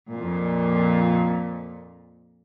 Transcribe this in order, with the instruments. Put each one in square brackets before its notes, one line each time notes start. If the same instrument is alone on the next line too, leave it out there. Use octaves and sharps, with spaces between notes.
[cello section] F2 A#2